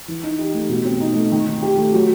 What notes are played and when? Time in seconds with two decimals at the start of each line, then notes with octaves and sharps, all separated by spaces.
0.08 E3
0.23 D#4
0.39 G4
0.54 A3
0.69 B2
0.85 C4
1.00 D#4
1.15 A3
1.32 D#3
1.47 D#4
1.62 G4
1.78 A3
1.93 F#3